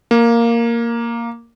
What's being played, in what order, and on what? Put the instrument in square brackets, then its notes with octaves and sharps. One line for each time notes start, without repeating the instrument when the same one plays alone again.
[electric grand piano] A#3